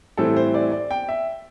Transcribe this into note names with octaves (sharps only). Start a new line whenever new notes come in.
A2 E3 G3 C4 A4
C5
D5
D5
G5
E5